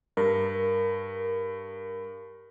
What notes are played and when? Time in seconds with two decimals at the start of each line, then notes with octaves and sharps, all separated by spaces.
0.17 G2 A#4